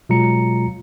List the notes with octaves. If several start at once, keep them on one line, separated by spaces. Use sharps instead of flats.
B2 F#3 G#3 F4 A#5 C#7